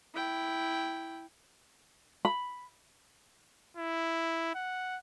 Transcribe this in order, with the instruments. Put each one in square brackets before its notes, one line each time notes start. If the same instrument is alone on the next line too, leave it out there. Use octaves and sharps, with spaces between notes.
[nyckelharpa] E4 G5
[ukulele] B5
[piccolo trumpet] E4
F#5